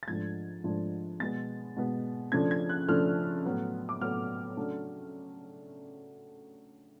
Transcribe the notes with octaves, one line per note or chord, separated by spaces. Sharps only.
A6
G#2 F3 A3 D4 G#6
G#2 F3 A3 D4
B2 G#3 B3 A6
B2 G#3 B3
C#3 F3 A3 D4 G#6
G#6
F#6
C#3 F3 A3 D4 F6
A2 F#3 B3
D6
A2 F#3 B3 F6
C#3 F#3 A3 D4